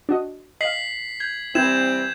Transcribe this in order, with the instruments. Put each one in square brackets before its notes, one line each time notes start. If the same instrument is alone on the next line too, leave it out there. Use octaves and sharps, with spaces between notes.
[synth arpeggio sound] D4 F#4 D#5
[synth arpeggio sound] D#5 F5 [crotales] B6 C7 F#7
[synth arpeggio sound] G6 [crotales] G#6
[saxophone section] E3 G3 C4 [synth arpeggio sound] E4 [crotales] G6 G#6 E7